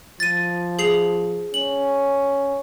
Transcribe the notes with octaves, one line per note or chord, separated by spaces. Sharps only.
F3 A6 D#7
G#4 C7 F7
C#4 F#7